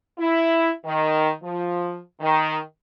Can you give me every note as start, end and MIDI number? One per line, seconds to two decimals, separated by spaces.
0.19 0.71 64
0.86 1.31 51
1.43 1.98 53
2.21 2.58 51